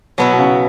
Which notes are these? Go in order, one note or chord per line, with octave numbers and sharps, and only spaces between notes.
B2 F#3 B3 E4
B2
C#3